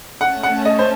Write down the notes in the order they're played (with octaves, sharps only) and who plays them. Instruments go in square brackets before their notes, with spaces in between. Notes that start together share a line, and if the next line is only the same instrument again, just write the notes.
[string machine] A3 C#4 A4 [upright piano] F#5
[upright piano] F#5
D#5
C5